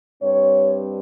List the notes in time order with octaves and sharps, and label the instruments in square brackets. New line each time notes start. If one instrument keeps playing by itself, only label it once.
[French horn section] G2 G3 C4 C#5